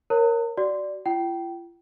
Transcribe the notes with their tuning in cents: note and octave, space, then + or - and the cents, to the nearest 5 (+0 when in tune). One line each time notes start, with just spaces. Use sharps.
A#4 +0 C#5 -20 A#5 -45
F#4 +20 D5 +0
F4 -45 G5 -20